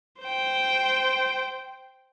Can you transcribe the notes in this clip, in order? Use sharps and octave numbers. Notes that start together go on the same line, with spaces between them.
C5 G5